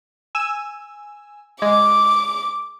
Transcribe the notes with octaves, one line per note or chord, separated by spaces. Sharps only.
G#5 E6
G#3 D6